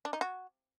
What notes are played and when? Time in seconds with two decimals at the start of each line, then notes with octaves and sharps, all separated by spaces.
0.05 D4
0.13 D#4
0.21 F#4